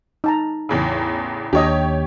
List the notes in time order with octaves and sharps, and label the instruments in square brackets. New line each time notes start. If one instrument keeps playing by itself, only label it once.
[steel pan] D#4 A5 A#5
[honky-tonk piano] A1 E2 C#3
[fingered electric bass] D#2 [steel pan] D4 D#5 [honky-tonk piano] G4 C#5